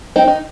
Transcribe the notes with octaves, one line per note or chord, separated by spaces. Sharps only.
C4 D#4
D#4